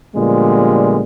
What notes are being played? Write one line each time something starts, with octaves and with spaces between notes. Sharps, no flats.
A#2 D3 F3 G3 G#3 B3